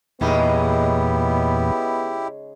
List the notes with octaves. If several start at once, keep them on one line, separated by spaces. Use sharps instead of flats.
E2 A#2 C#3 G#3 B3 D#4 E4 G4